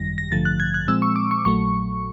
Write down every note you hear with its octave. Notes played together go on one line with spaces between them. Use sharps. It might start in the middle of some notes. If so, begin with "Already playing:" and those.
Already playing: G#1 F#2 D#3 G3 A#6
A#6
A1 G2 D3 F3 A3 A6
F#6
G#6
F#6
A#2 F3 G#3 C4 E6
C#6
D6
C#6
A#1 A#2 F#3 A3 C#6